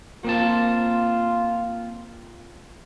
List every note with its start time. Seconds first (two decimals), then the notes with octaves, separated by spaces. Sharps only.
0.24 A#3 C4 F4 A5